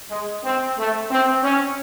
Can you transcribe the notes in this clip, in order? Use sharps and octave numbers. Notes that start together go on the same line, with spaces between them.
G#3
C4
A3
C4
C#4